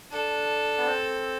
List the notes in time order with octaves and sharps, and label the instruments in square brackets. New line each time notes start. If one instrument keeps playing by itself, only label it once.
[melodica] D4 [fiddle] A4
[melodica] B3
C4